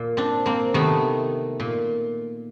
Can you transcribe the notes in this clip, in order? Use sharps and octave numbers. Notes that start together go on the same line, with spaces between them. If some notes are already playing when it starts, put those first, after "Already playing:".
Already playing: A#2
C4 D4
A#3 C4
C3 D#3 A3 B3
A#2